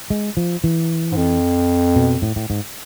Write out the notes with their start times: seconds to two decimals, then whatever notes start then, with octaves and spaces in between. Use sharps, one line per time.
0.10 G#3
0.37 F3
0.64 E3
1.12 G#2
1.17 F2
1.96 B2
2.22 A2
2.36 A2
2.50 G#2